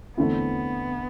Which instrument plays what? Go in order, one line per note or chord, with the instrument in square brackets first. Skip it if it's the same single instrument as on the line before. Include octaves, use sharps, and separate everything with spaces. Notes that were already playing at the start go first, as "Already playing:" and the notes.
[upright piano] E2 D3 A3 C4 E4 [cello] B3